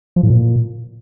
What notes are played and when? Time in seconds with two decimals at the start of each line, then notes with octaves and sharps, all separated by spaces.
0.16 F3
0.23 A2
0.30 A#2